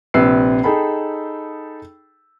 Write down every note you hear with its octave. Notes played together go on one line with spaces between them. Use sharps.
A#1 C3 C4 B4 E6 C7
D#4 G#4 A4 G5 B5